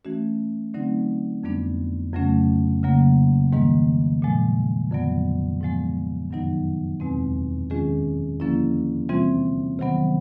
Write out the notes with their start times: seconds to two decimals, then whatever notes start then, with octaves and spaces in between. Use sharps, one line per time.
0.05 E3 A3 C#4 F#4
0.74 D3 F#3 A3 C4 D#4
1.43 F2 D3 G3 B3 D4
2.13 F2 C#3 F#3 A3 C#4
2.83 C#3 F#3 A#3
3.53 G#2 D#3 G3 A#3
4.22 A#2 F3 G#3
4.91 F2 D3 F#3 B3
5.61 G#2 F3 G#3 B3
6.31 F#2 D#3 F#3 B3 D#4
7.00 E2 B2 G#3 C4
7.70 D#3 G#3 C#4 F4 G#4
8.40 D3 F3 A#3 C#4 E4
9.09 C3 E3 G3 C4 F4
9.79 C3 D#3 F#3 B3